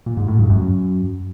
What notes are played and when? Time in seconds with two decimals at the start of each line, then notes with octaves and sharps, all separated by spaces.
0.06 A#2
0.17 G#2
0.28 A2
0.39 G2
0.50 F#2